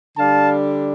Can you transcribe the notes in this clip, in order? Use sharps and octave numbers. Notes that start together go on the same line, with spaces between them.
D3 G3 D4 F5 A5